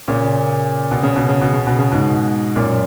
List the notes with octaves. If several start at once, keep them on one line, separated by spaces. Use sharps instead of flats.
A#2 C#3
B2
C#3
B2
C#3
B2
C#3
B2
C#3
G#2 B2
F#2 A#2